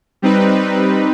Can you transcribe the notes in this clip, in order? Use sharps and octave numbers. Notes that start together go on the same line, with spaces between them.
G3 C4 D#4 B4